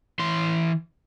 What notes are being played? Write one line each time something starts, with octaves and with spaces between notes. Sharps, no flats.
E3 C6